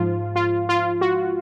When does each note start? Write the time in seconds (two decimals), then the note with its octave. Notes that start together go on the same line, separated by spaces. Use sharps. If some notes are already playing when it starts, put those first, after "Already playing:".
Already playing: G#2 F3 F4
0.36 F4
0.69 F4
1.01 F#4